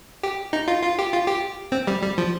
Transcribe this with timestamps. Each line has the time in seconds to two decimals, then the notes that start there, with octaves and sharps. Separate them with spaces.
0.23 G4
0.53 D#4
0.68 F4
0.83 F4
0.99 G4
1.13 F4
1.27 G4
1.72 C4
1.87 G3
2.02 G3
2.18 F3